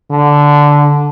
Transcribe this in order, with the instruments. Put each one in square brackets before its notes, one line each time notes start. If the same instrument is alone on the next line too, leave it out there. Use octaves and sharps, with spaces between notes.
[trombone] D3